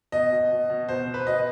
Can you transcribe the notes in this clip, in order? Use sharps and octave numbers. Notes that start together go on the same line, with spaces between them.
B2 D#5
B2
B2
B2
B2 C5
B2
B4
B2 D#5